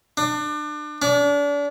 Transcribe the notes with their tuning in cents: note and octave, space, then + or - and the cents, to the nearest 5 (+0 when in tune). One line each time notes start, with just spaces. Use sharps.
D4 +30
D4 -35